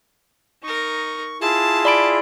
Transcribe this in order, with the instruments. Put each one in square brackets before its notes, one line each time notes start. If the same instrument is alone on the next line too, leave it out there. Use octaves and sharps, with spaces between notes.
[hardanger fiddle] D#4 A#4 [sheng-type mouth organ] C#6
[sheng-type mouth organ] E4 F4 G#4 [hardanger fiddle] A5
[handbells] D5 B5 D7